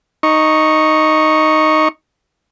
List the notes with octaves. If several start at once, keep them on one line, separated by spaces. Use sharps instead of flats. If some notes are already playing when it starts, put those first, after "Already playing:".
D#4 C#6